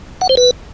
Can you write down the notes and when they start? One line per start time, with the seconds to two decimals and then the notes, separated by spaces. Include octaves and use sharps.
0.21 F#5
0.29 C5
0.37 B4